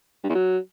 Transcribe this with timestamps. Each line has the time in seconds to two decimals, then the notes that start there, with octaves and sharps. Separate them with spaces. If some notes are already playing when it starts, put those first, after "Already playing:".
0.23 G2
0.29 E2
0.35 F#3